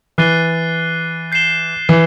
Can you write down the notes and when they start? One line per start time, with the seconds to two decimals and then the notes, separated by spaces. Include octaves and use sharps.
0.18 E3 F#6 A6 C7 D#7 G7
1.32 G6 C7 E7 G7
1.89 E3